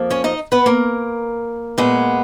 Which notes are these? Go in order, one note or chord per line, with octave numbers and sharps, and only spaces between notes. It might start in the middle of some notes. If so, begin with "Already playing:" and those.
Already playing: F2 F3 A#3
C#4 C#5
D#4 D#5
B3 B4
A#3 A#4
A#2 G#3 B3